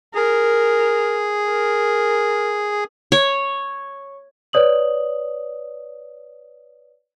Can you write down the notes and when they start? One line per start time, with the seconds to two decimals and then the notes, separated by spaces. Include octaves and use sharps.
0.15 G#4 A#4
1.49 A#4
3.12 C#5
4.53 B4 C#5 D5 D#6 F#7